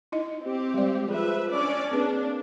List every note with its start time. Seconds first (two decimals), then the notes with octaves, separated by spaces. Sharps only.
0.12 D#4 E4 D#5
0.42 C4 G4
0.74 G3 G#3 D5
1.08 F3 G#4 B4 E5
1.50 C#4 D4 D5
1.92 A#3 C4 D4 G#4 B4